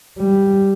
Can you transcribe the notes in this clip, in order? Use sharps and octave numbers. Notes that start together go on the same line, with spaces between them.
G3